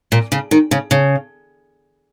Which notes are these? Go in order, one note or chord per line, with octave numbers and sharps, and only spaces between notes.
A#2
C#3
D#3
C#3
C#3